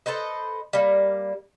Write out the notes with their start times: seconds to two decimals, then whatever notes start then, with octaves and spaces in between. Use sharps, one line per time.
0.06 A4 B4 C5 D#5
0.73 G3 A#3